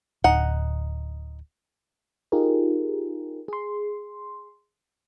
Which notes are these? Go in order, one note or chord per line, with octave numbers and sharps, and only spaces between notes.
D1 D#4 F#5
D#4 F4 G4 G#4 A#4
G#4 C6